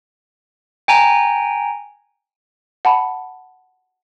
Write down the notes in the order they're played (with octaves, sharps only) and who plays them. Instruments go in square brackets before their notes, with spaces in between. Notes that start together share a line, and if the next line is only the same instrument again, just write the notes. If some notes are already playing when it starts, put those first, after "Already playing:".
[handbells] G5 G#5 A#5
[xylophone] F#5 A5 B5